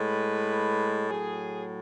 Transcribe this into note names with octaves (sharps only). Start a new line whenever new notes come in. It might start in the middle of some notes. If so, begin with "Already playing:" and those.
Already playing: A2 G#3 B4
A2 F#3 G#4